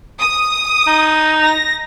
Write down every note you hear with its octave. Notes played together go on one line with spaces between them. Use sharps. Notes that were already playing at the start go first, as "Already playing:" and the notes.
D#6
D#4
A#6